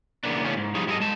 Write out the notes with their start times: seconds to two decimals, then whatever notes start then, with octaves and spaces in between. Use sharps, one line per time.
0.23 E2 C#3 A#3 B3 D4
0.44 C#3 E3 A3 B3 C#4
0.57 G#2
0.75 F3 G3 B3 D#4 G#4 C#5
0.87 G3 E4 G#4 A4 D#5
1.00 G#3 A5